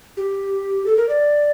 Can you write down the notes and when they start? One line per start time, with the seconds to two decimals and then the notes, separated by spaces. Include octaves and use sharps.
0.17 G4
0.86 A4
0.97 A#4
1.09 D5